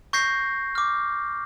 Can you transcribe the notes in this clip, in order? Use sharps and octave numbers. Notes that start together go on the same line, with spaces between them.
C#6 G6 A#6 C7
D6 F6